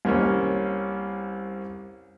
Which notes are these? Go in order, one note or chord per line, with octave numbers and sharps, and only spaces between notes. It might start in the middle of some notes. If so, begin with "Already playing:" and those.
C2 A#3 C#4 C#5